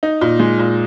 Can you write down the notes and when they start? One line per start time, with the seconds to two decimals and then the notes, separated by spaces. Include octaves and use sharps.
0.03 D#4
0.21 A#2
0.40 G#3
0.59 A#2